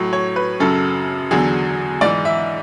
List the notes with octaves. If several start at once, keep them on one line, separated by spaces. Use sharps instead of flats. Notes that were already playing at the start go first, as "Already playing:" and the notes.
Already playing: A2 F#3
C#5
B4
F#2 C#3 F#3 A4
E2 D3 F#3 G#4
G#2 E3 D5
E5